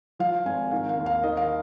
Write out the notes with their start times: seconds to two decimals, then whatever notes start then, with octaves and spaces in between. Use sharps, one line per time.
0.19 F3 F5
0.45 G#1 G#5
0.71 D#3 F5
0.89 F5
0.98 D#2
1.06 F5
1.23 D#3 D#5
1.37 F5